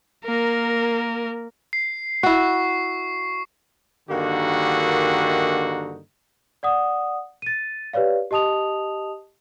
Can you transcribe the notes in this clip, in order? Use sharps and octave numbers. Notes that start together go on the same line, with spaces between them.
A#3 A#4
C7
E4 F#4 C#6 C7
G2 D3 D#3 A#3 D#4 F#4
D5 F#5 D#6
A6 D#7
G4 B4 C#5 D5 F5
G4 D#5 A5 D#6 F7